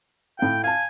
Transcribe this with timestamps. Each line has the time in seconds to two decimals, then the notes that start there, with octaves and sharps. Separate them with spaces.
0.39 A2 F5 G5
0.64 F5 G#5 A5